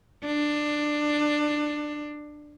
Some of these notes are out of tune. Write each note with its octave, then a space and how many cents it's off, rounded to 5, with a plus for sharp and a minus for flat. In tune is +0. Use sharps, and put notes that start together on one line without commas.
D4 +15